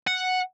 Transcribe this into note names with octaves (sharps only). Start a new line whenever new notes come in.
F#5